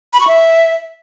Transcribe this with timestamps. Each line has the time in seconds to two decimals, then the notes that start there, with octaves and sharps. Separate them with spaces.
0.13 B5
0.20 C#6
0.27 E5